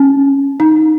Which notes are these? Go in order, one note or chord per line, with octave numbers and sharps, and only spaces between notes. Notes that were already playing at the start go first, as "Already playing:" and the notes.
Already playing: C#4
D#4